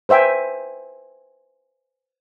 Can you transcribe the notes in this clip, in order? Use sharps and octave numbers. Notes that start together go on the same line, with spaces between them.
B4 C5 E5 G5 G#5